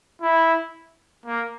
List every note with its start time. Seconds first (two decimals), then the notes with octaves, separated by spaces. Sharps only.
0.22 E4
1.26 A#3